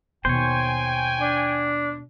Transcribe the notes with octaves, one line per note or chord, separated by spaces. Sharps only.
D#2 B2 C5 C#5 G5 G#5
D4